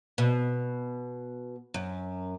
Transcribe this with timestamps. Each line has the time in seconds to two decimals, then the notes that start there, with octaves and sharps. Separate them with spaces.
0.18 B2
1.74 F#2